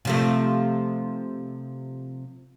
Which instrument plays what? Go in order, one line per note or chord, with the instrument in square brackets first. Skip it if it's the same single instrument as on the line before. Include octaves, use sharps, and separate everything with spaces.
[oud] C3 F3 A3